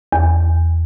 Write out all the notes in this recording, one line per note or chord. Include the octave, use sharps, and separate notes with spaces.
E2